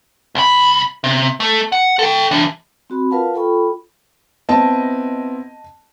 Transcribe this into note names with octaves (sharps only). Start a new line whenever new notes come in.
C2 B5
C3
A3 A4
F#5
A4 G5
E3 D4
C4 F#4 B5
F4 A#4 B4 F5 F#5 A5
F4 A4 G5 B5 C#6
B3 C4 E4 D#5 A5